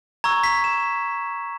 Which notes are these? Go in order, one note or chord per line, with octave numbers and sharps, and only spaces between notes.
A#5 C#6 E6 G#6
B6
E7